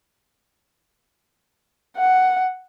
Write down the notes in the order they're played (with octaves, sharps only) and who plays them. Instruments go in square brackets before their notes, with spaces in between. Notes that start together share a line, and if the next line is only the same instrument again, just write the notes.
[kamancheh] F#5